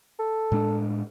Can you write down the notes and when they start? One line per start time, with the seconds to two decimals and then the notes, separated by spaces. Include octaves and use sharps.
0.19 A4
0.52 A2 G#3 D4